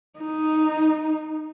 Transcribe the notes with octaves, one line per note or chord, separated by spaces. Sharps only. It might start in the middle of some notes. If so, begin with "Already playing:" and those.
D#4